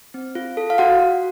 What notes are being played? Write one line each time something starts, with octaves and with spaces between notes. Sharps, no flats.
C4
F4
A4
F5
F#4 F#5
F#4